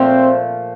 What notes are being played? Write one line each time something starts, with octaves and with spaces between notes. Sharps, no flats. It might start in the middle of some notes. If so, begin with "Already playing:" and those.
Already playing: A#2 F3 A3 C4